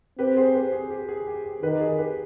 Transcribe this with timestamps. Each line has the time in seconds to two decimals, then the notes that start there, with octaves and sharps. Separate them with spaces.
0.19 C4 G4 B4
0.37 G#4 C5
0.54 G4 B4
0.72 G#4
0.90 G4
1.09 G#4
1.27 G4
1.45 G4
1.62 D#3 G4 B4
1.72 G4
1.81 G#4
1.98 G4 B4